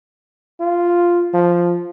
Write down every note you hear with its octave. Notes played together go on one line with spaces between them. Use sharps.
F4
F3